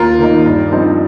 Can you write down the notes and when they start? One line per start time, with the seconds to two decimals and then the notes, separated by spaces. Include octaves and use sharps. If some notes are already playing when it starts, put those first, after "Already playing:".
Already playing: D#2 F4 A#4
0.19 D#3 A#3 D#4
0.46 G2
0.72 F3 C4 D#4